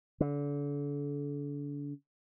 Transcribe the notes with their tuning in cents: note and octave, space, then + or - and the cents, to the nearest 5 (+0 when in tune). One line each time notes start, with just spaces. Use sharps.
D3 -35